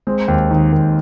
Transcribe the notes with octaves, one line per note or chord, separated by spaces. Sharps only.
G#3 C4
D#2
D#3
D#2